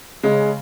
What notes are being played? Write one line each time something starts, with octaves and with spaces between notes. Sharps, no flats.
C#3 G#3